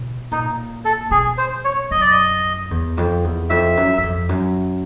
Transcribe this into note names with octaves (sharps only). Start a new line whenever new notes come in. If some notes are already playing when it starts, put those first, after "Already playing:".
Already playing: B2
A#2 D#4
A4
B2 G#4
C5
C#5
F#2 D#5
D5
D#5
E2
F2
E2
F2 E5
F#2
F#2
F2
F#2